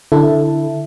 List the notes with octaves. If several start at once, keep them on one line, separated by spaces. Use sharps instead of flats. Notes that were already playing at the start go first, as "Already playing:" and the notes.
D3 E4 A4